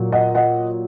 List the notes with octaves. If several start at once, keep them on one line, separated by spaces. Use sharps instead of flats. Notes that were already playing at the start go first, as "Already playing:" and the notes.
Already playing: A#2 F#3
D#5 F#5
D#5 F#5